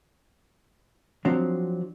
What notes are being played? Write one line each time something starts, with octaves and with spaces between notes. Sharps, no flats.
F3 F#3 C4 D4